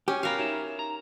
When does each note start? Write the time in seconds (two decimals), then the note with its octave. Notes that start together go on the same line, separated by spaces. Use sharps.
0.08 C#4 G4
0.23 F#4 A#4 F5 B5
0.38 D#4 C#5 E5
0.79 A#5